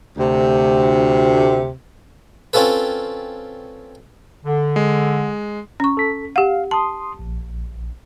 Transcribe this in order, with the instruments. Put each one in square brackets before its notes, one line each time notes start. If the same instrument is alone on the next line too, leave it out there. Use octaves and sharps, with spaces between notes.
[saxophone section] D2 C3
[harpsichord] C4 C#4 F4 A4 B4
[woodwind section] D3
[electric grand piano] G#3
[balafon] C#4 C#6
[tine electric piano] A4 B6
[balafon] G4 F#5 [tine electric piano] F5
[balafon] A5 [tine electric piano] C6 D#6
[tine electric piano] A#1